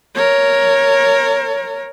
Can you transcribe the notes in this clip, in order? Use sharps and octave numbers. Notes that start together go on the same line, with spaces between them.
A#4 C#5